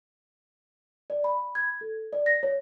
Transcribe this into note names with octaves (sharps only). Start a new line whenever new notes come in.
D5
B5
G#6
A4
D5
A#6
C#5